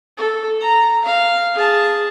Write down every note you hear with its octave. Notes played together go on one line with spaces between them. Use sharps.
A4
A#5
F5
G#4 A5